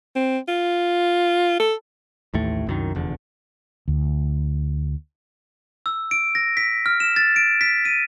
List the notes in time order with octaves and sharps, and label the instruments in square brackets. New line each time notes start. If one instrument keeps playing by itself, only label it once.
[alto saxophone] C4
F4
A4
[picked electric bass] A1 D#2 A2 A3
C2 F#2 D#3
F1 E2 D3
[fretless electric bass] D2
[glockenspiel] E6
D7
A#6
B6
F6
E7
A6
D7
B6
D#7